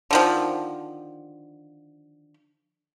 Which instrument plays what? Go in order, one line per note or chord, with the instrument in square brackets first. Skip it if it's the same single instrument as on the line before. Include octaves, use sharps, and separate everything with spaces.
[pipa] D3 D#3 F3